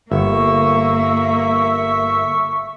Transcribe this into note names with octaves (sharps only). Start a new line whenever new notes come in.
G1 A#3 E5 C#6